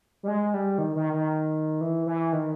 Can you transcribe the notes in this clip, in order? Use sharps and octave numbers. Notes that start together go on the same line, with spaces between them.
G3
G#3
G3
D#3
D#3
D#3
E3
E3
D#3